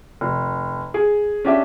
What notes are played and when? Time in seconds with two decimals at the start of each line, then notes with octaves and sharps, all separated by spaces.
0.21 F1
0.94 G#4
1.44 C#4 D4 G4 E5